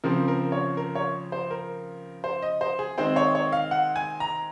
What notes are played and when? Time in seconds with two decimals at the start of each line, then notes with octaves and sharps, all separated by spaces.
0.04 C#3 F3 C4 A#4
0.28 A#4
0.52 C#5
0.77 A#4
0.95 C#5
1.32 C5
1.51 A#4
2.24 C5
2.42 D#5
2.61 C5
2.79 G#4
2.98 D#3 G#3 C4 C5
3.16 C#5
3.35 C#5
3.52 F5
3.71 F#5
3.96 G#5
4.20 A#5